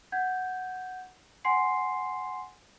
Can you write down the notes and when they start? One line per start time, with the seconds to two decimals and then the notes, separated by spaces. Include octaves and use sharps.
0.12 F#5 G6 G#6
1.45 F#5 G#5 C6 C7